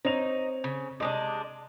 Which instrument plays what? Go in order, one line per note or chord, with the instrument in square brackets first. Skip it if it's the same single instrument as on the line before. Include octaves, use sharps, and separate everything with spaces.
[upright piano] C4 C#5 F7 [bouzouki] D#4
[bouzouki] C#3
[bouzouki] C3 G#3 D4 [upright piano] D#5